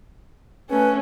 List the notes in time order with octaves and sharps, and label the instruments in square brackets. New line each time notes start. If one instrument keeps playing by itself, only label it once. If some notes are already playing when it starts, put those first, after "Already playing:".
[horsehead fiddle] A3 C#4 [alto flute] B4